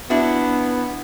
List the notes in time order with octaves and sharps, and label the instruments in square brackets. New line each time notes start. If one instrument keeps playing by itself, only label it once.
[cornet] B3 [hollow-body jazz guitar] D4 E4 F#4